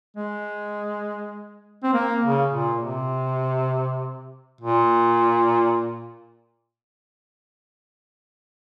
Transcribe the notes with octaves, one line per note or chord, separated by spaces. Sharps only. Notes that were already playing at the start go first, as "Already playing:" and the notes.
G#3
C4
A#3
C#3
A#2
C3
A#2